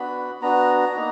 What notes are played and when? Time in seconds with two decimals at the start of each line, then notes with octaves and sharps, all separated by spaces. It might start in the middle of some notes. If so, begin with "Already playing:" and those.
Already playing: B3 D4 F#4 B5
0.41 B3 D4 F#4 A#5
0.96 A#3 D#4